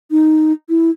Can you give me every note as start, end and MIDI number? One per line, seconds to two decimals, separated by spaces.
0.11 0.52 63
0.69 0.90 64